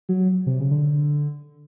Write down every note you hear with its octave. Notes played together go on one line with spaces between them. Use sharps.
F#3
C3
C#3
D3